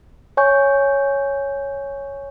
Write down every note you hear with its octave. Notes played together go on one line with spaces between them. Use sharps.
C#5 G#5 C#6 G6